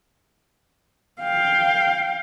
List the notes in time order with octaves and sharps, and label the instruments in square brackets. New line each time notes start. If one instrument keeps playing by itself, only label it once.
[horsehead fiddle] F5 G5